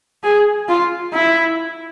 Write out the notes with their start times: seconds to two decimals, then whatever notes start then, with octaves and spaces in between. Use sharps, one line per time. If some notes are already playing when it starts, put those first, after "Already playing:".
0.23 G#4
0.68 F4
1.13 E4